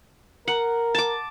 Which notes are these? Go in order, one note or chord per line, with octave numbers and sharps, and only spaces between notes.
A#4 F#5
A5 D6